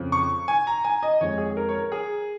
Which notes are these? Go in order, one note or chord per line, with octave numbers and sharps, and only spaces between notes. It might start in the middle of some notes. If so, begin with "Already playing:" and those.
Already playing: F2 C#3 F3
C#6
G#5
A#5
G#5
D#5
F2 F3 G#3 C#5
G#4
G#4
A#4
C#5
A#4
G#4